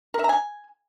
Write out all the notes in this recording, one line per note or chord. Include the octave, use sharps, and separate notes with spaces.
A#4
E5
A#5
G#5